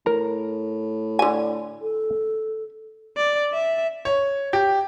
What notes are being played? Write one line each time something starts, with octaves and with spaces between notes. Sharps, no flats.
A2 A#4 A#5
D3 G#5
A4
D5
E5
C#5
G4